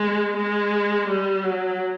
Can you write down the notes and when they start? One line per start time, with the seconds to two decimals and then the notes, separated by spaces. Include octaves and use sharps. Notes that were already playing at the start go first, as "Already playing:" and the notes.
Already playing: G#3
0.37 G#3
1.09 G3
1.44 F#3